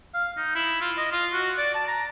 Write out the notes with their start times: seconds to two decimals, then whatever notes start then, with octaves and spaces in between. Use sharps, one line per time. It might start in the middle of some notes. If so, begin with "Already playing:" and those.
0.14 F5
0.37 D#4
0.55 E4
0.81 F4
0.98 D#5
1.12 F4
1.33 F#4
1.58 D5
1.75 A5
1.88 A#5